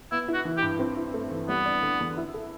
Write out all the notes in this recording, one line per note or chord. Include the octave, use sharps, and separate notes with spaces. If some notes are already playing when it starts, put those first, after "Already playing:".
B3 E4
E4
F#4
E3
G4
G2
C4
E4
A3
E3
G3 B3
D4
D3
E2
E4
A4